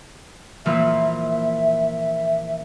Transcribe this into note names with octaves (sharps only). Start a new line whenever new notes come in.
A#2 E3 F3 E5